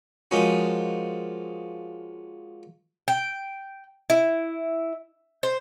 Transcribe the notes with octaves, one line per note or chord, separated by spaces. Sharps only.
F3 G#3 A#3 C#4 D#4 F#4
G5
E4
C5